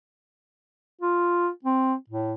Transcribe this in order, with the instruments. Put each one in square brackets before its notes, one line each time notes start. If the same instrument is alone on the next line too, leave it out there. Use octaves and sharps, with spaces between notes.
[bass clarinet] F4
C4
A2